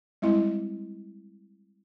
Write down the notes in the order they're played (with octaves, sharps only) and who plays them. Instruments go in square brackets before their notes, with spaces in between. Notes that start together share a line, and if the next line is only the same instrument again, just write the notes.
[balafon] G3 G#3 C4 E4 D#5